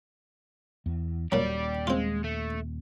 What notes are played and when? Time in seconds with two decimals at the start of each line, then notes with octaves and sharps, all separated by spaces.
0.86 E2
1.32 D#1 A#2 F#3 G3 G4 D5
1.87 G#3 C4 F4
2.24 A3